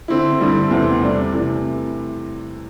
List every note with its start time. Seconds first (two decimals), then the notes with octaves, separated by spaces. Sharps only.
0.08 D3 C4 E4
0.40 G2 D3 G3 C4 E4
0.71 E2 C3 E3 A3 C4
1.01 C3 G3 D4
1.32 C3 E3 A3